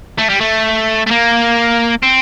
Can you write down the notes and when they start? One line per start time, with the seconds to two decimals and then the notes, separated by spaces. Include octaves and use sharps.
0.18 A3
0.29 G3
0.41 A3
1.06 A3
1.11 A#3
2.03 C4